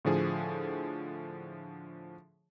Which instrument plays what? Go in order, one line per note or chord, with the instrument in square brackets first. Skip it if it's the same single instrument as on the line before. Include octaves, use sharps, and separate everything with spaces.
[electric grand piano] A2 D3 F3 G#4